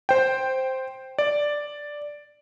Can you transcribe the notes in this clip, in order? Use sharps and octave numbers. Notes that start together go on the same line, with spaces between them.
C5 G5
D5